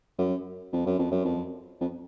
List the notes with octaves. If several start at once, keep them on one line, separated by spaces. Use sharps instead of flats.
F#2
F2
F#2
F2
F#2
F2
F2